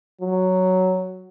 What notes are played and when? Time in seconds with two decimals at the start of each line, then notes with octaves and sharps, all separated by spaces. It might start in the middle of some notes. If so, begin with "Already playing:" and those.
0.21 F#3